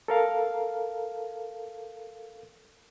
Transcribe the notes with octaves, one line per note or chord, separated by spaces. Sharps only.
A4 A#4 F5